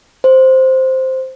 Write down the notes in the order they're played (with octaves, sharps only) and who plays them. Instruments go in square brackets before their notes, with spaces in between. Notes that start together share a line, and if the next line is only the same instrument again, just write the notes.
[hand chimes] C5